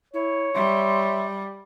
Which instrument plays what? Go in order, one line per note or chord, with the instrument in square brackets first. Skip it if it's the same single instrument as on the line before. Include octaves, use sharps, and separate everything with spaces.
[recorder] E4 [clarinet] C#5
[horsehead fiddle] G3 [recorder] E5 [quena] C6